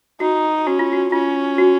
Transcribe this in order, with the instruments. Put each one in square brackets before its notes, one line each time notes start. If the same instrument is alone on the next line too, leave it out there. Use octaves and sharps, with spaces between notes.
[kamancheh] D#4 [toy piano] F#4
[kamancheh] C#4 [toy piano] F#4
[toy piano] F4
F#4
[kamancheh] C#4 [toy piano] F4
[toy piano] F#4